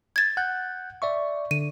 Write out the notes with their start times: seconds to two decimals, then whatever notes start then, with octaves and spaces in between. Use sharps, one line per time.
0.16 G#6 A6
0.37 F#5 F#6 G6
1.02 D5 E5 C#6
1.51 D3 D#7